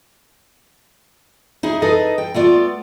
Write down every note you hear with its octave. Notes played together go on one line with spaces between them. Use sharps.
D#4 E4 G#4
D#4 G#4 A4 B4 D#5
G5
A3 B3 F4 D5